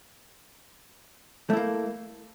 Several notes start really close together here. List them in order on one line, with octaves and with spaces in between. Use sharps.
A3 E4 A#3